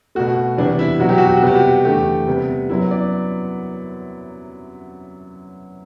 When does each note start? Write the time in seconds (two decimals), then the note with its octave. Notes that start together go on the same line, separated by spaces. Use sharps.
0.15 B2 A3 F#4
0.57 C3 E3 G3 B3 D4
0.79 E4
1.00 B2 F#3 B3 F#4
1.09 G4
1.18 F#4
1.28 G4
1.37 F#4
1.42 C3 G3 B3 G4
1.55 F#4
1.85 E2 D3 A3 G4
2.27 C3 G3 B3
2.69 F#2 F#3 B3 E4
2.91 D5